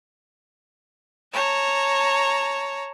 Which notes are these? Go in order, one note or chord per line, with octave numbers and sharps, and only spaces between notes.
C#5 A5 A#5